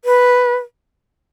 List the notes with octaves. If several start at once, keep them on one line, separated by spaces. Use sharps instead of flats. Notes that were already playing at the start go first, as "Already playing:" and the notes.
B4